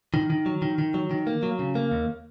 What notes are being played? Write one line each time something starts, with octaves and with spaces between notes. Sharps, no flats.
D#3
D#3
F#3
D#3
D#3
F#3
D#3
A#3
F#3
C#3
A#3
D#2